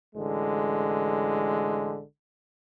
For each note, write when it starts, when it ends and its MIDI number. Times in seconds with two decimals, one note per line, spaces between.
0.15 2.02 33
0.15 2.02 50
0.15 2.02 56